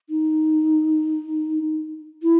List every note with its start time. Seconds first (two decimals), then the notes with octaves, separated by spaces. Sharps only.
0.10 D#4
2.23 E4